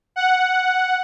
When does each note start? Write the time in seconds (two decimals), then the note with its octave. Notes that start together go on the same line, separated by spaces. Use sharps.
0.16 F#5